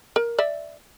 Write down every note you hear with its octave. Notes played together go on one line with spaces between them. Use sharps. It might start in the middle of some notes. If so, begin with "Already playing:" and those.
A#4
D5 E5